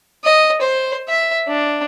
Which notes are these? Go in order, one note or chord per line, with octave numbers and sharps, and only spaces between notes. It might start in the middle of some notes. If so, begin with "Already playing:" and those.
D#5
C5
E5
D4